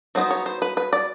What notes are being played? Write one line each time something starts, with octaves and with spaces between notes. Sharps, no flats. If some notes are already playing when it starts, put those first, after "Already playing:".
F#3 B3 D#4 C5
C#5
C5
B4
B4
D5